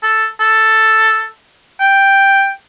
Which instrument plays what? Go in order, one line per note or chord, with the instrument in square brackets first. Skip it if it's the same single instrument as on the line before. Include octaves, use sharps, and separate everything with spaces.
[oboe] A4
A4
G5